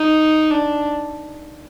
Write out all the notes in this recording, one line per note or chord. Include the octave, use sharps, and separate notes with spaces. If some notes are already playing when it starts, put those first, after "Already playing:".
Already playing: D#4
D4